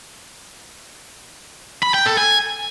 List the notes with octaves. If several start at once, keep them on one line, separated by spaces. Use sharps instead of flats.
B5
G5
A4
G#5